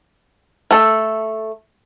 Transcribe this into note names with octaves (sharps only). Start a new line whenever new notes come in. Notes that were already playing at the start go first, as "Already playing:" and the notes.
A3 A4